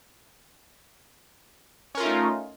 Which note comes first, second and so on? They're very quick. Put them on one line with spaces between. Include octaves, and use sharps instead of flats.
C#4 A#4 F4 A3 D#4